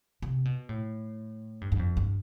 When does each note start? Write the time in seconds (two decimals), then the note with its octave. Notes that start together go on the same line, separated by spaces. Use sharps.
0.22 C3
0.45 B2
0.69 A2
1.61 G2
1.72 G2
1.79 F2
1.97 G2